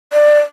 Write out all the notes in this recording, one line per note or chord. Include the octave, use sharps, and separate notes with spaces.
D5